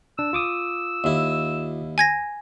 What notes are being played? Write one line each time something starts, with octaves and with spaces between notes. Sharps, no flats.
D4 E6
F4 D6 D#6
D#2 E4
G#5 G#6 A#6